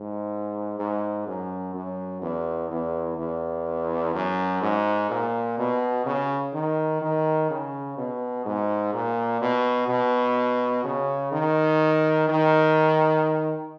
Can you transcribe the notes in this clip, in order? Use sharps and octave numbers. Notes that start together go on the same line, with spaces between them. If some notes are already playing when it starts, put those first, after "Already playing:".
Already playing: G#2
G#2
F#2
F#2
E2
E2
E2
F#2
G#2
A#2
B2
C#3
D#3
D#3
C#3
B2
G#2
A#2
B2
B2
C#3
D#3
D#3